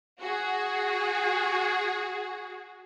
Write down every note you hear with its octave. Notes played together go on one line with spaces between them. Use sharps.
F#4 G#4